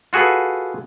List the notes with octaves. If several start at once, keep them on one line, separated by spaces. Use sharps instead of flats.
F4 F#4 G#4 A4 B4